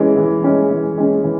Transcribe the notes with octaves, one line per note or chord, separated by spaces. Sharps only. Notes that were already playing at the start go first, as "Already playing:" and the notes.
Already playing: E3 G#3 C#4
E3
G#3 C#4
E3
G#3 C#4
E3